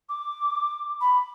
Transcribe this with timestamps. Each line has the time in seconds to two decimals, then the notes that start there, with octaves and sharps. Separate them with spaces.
0.09 D6
1.01 B5